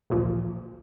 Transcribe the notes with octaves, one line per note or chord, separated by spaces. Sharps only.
A1 D2 A#2 F3